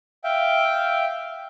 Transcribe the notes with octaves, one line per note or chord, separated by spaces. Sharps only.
E5 F5 G5